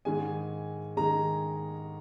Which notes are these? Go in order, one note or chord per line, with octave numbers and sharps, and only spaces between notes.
G#2 D#3 G#3 G#5
D#3 G#3 A#5